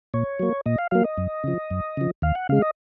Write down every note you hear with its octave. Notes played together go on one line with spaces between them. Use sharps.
A#2 C#5
F#3 A#3
A#2 D#5
F5
F#3 A#3 F5
D#5
F#2
C#3 F3
F#2
C#3 F3
D#2 F5
F#5
C#3 G#3 F5
D#5